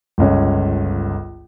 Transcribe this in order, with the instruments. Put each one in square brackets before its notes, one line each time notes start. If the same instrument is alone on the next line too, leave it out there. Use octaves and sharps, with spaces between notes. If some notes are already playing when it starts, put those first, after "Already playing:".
[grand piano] G1 C#2 C#4